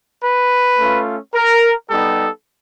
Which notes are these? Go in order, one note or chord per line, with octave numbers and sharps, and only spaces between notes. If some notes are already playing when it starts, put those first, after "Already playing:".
B4
A3 C#4 F4
A#4
G3 B3 D#4 G4 A4